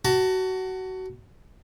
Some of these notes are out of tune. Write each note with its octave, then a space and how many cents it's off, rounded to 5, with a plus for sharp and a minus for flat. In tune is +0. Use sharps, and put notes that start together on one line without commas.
F#4 +20 A5 +25